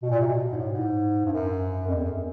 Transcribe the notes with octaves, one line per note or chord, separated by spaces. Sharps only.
B2
A#2
C3
B2
G#2
A2
G#2
G2
F#2
F2
E2
F#2